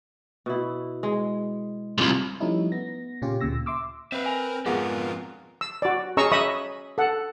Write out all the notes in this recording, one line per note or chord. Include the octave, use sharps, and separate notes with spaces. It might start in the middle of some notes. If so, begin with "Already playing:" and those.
B2 E4
G#3
C2 G#2 F4
F3 G3 A3 C#4 D#4 E4
B3 A#6
A#2 C#3 C#4 F4 G4
D2 A#2 C#3 E6 A#6
E5 C6 D6 E6
C4 B4 E5 F5
A#4 G#5
F2 G#2 B3 F4 G#4 A#4 E5 F#5
E6
F#4 D5
C#4 G#4 D#5 A#5 C#6 E6
D#5 E5 B5 C#6 D#6
A4 F#5